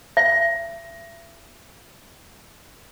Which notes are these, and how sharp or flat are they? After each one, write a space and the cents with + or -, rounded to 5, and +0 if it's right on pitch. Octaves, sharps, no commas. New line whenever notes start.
E5 +35